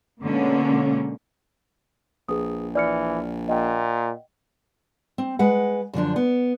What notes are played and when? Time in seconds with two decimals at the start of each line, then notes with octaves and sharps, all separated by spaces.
0.22 B2 D3 G#3 A#3 C#4
2.29 A#1 G#4 B4 D#6
2.75 E3 D5 F6 C#7
3.49 A#2 D#5 F#5 G5
5.18 C4
5.39 G#3 B4 F#5
5.93 F#2 D3 F3 D4
6.16 B3